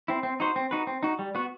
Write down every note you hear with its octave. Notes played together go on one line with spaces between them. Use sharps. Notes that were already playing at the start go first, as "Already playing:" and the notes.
C4 E4
C4
D#4 F#4 C5
C4
D#4 F#4 B4
C4
D#4 F#4
G3
B3 F#4